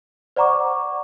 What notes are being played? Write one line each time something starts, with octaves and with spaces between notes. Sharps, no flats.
C5 D5 F#5 A#5 C#6 D6